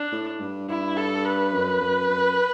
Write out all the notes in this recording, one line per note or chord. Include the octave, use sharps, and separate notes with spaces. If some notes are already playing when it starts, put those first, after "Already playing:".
Already playing: D4
A2
G2
G2 E4
A4
B4
F#2
F#2
F#2